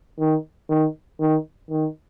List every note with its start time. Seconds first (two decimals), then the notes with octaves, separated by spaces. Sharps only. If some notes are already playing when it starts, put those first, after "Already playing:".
0.20 D#3
0.70 D#3
1.20 D#3
1.71 D#3